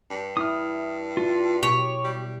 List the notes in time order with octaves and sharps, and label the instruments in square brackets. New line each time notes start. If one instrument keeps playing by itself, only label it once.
[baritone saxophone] G2
[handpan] E4 [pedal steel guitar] D#6 F6
[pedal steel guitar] F4
[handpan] B2 [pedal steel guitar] G4 [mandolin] C#5
[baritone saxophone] G3